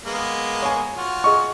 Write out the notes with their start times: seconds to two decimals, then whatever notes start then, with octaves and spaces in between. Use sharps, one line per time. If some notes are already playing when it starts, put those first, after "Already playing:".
0.05 G#3 A#3 B3
0.63 C#5 G#5
0.97 F4 F#4
1.24 G#4 D#5 C#6